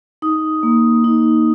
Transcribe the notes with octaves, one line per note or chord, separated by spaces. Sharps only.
D#4 D#6
A#3
D#4